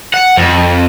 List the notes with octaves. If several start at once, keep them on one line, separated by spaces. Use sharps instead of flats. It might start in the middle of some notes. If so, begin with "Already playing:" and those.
F#5
F2